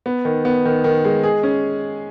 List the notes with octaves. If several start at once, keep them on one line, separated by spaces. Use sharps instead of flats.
B3
D#3
B3
D#3
D#3
G#3
G#4
C#4